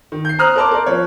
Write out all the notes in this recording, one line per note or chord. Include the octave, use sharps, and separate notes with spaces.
D#3
G6 C7
C5 A#5 D#6 F6 F#6
A#4 C#5 A5 C6 D6
A#4 D5
F3 C#5